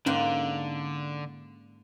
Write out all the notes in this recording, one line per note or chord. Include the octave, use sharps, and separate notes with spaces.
G#2 D3 A#3 C#4 C5